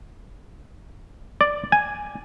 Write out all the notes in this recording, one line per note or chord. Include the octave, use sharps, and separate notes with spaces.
D5
G#5